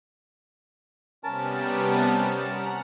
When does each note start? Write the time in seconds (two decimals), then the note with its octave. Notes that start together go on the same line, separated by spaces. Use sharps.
1.24 C3 G3 B3 C#4 A#4 A5
2.46 F#5 F6